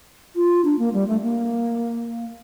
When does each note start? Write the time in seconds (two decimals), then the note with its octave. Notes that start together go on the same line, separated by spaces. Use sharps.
0.36 F4
0.65 D4
0.79 A#3
0.93 G3
1.08 A3
1.22 A#3